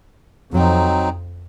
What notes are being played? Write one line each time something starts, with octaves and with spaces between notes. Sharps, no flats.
F2 F#3 C4 D#4